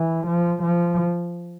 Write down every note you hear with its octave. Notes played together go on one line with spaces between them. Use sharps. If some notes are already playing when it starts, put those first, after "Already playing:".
Already playing: E3
F3
F3